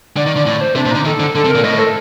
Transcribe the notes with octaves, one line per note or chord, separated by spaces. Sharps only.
D3 D5
D#3
D3
A2 D5
C5
C3 D4
A#2
D3 D#4
D#3 A4
D3
D3 A4
C3
A#4
A#2
A2 D#5
A4